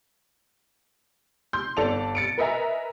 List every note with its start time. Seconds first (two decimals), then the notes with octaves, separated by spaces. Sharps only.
1.53 C6 G6
1.77 G1 A4 D5 A5 F7
2.15 A6 C#7 D7
2.38 A#4 B4 D#5 E5 G#5 A#5